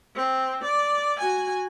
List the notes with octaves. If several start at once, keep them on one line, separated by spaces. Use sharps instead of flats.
C4
D5
F#4 G#5